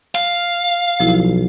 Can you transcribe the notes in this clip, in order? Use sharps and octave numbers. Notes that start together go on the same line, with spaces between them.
F5
B1 F3 E4 F4